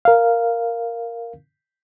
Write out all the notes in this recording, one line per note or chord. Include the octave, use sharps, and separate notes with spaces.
A#4 F5